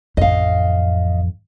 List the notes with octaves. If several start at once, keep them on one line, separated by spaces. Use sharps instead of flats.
A1 F2 D#5 F5